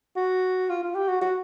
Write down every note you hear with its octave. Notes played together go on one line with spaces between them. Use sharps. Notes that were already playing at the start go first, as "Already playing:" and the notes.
F#4
F4
F4
G4
F#4
F#4